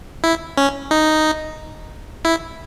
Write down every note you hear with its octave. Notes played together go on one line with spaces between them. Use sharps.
E4
C#4
D#4
E4